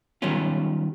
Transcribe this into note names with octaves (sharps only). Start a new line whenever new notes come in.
D#3 F#3 G3 B3 C#4 F4